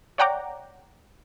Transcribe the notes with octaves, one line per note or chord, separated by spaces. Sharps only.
C#5 D5 F#5 G5 A#5 D6